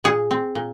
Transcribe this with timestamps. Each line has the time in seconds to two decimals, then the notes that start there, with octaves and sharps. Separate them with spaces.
0.04 A#2 G#4
0.31 C4
0.55 A#2